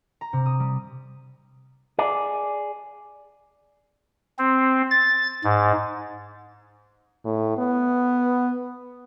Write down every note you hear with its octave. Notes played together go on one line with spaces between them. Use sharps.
A#5
C3
D#6
G3
G#4 D5
C4
A6
G#2
A2
B3